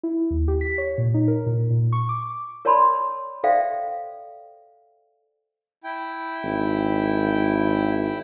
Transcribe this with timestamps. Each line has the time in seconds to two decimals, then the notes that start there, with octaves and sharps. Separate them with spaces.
0.03 E4
0.31 D#2
0.48 G4
0.61 B6
0.78 C#5
0.98 A#2
1.14 D#4
1.28 A#4
1.46 A#2
1.71 A#2
1.93 C#6
2.09 D6
2.65 A#4 C#5 D5 A5 B5 C6
3.44 A4 C5 D5 E5 F5 G5
5.84 E4 G5
6.44 G#1